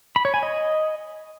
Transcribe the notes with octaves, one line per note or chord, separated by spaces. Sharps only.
B5
C#5
G#5
D#5